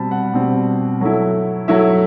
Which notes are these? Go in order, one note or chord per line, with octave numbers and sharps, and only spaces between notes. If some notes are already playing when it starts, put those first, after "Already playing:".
Already playing: B2 G3 C4 A5 B5
F#5
B2 G3 C4
F#3 A3 E4
F#3 A3 E4 E5